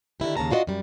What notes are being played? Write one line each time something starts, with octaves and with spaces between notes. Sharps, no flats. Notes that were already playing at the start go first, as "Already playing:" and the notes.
D3 D#3 E4 G4
D#2 C#3 A5 A#5
D4 F4 F#4 B4 D#5
F#2 G3